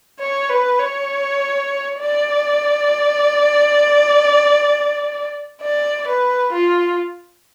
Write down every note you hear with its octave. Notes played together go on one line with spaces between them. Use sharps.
C#5
B4
C#5
D5
D5
B4
F4